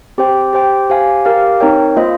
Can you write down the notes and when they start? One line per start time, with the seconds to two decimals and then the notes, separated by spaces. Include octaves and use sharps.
0.18 C4 G4 C5 G5
0.53 G4 C5 G5
0.90 G4 C5 F5 G#5
1.25 G4 A#4 F5
1.60 C4 D#4 A#4 C#5 G5
1.97 A#3 F4 C5 D#5